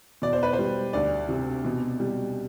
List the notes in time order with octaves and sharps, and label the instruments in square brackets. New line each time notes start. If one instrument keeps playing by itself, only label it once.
[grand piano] B2 D5
C5
B4
C5
G3
D2 D5
C3
B2
G3